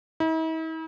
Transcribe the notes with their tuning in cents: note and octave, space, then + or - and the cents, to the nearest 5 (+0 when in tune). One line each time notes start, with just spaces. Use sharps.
E4 -45